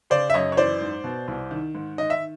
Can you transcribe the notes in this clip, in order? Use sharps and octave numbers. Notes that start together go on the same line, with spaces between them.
C#3 C5 D5
E5
F#2 C#5 D#5
C#5
E3 C5 D5
G#2
B2
C2
D#3
G#2
D#3 D#5
E5